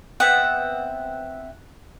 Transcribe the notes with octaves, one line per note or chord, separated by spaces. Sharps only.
B3 C4 E5 F#5